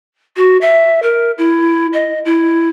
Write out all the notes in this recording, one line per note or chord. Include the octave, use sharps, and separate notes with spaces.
F#4
E5
A#4
E4
D#5
E4